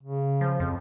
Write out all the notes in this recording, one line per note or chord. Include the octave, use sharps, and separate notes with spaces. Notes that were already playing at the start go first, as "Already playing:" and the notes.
C#3
F3
F2